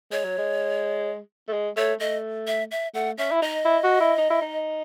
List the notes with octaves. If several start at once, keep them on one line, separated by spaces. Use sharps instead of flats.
G#3 C#5
F#3
G#3
A3
G#3
A3 C#5
A3 D#5
E5
E5
A3 F#5
C#4 E5
E4
D#4 D#5
E4
F#4
E4
D#4
E4
D#4